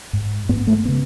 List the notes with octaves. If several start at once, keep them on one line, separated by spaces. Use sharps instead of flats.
G#2
G#2 B3
A3
C#3 B3